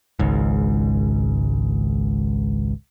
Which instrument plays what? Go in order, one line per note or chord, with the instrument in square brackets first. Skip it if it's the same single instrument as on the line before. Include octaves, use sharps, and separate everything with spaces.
[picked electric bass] G#1 C#2 G#2